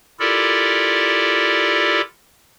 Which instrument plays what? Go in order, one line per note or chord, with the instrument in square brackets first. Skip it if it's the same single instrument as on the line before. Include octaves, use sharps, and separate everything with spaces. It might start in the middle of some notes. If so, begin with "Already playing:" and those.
[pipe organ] E4 F4 G4 A4 A#4 D5